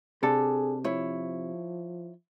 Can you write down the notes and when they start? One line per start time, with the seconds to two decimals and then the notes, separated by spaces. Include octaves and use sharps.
0.23 C3 D4 G#4 A4
0.84 F3 E4 C#5